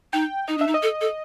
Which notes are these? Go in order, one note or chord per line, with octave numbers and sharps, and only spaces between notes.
D#4 G5
D#4 D#5
D4 E5
D#4
D#5
A4
A4